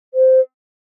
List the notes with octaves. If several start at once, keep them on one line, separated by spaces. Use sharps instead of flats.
C5